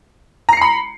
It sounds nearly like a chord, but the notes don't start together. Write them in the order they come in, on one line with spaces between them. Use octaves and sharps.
A#5 C7 C#7 B5